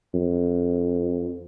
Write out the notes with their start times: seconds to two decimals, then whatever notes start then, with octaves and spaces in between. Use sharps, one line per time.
0.14 F2